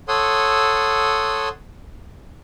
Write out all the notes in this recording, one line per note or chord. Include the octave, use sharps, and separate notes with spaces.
A4 C#5 F#5 C6 D#6 E6